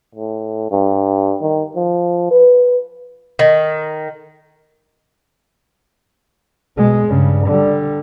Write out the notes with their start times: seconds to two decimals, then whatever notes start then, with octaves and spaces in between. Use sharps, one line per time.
0.15 A2
0.71 G2
1.41 D#3
1.75 F3
2.31 B4
3.39 D#3
6.77 B2 G#3
7.07 G2 C#3
7.48 D3 G3